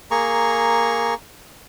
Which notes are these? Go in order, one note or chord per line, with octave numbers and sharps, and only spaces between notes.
A#3 G#4 A#5 C#6